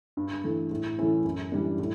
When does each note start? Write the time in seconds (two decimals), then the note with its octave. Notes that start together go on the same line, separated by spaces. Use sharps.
0.17 G2
0.44 E3 A3
0.71 A2
0.98 E3 A3 C#4 E4
1.25 F#2
1.52 E3 G3 D4
1.79 A2